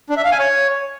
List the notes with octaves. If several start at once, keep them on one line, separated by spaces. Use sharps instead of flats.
D4
E5
F5
G#5
C#5